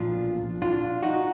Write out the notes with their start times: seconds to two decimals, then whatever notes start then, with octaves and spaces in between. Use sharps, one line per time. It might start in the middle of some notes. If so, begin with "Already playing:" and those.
Already playing: B1 A#2 F3 D4 F4
0.62 D4 F4
1.03 D#4 F#4